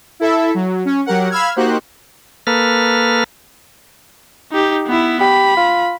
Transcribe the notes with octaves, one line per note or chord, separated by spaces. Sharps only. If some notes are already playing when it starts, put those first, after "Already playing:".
E4 A4 E5
F#3
C#4
F#3 G4 A#4 F#5
F5 B5 E6 F6 G#6
A#3 D#4 F#4 G4 C5 F#6
A#3 A4 B4 F6
D#4 G4
B3 E4
G4 B5
F4